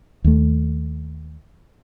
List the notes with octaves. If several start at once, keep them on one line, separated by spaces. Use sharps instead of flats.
D#2 A3